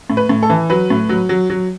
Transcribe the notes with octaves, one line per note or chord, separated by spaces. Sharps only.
A2
B4
A2
A4
E3
F#3 B4
A2
F#3
F#3
F#3